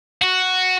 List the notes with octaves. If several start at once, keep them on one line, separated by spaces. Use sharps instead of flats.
F#4